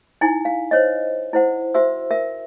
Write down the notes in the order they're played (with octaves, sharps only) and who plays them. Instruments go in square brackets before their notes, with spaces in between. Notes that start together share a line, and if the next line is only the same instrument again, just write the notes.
[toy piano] D#4 E4 G#5
F5
C5 C#5 D#5
E4 C5 F#5
F#4 C5 E5 E6
A#4 E5